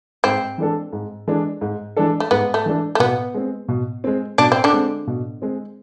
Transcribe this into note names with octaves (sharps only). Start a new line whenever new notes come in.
G#2 C4
E3 G#3 D4 A4
G#2
E3 G#3 D4 A4
G#2
E3 G#3 D4 A4
A3
G#2 B3
A3
E3 G#3 D4 A4
A3
B2 B3
G#3 C4
B2
G#3 C4
B2 D4
C4
D3 D4
G#3 C4
B2
G#3 C4